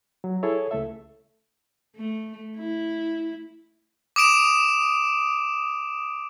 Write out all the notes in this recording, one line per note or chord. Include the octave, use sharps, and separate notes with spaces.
F#3
E4 G#4 A4 C#5
C#2 A3 A4 E5
A3
E4
D6 D#6 D7 E7